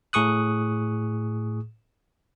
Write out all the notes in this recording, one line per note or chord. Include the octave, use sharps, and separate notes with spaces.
A2 G#4 C#6 D#6 F#6